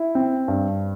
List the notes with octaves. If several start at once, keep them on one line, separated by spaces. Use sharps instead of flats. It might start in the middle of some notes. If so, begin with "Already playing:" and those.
Already playing: E4
C4
G2